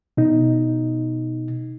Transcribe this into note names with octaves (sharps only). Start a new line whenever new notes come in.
B2 D#4